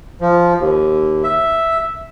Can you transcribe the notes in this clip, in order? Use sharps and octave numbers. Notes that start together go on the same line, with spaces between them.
F3
D#2
E5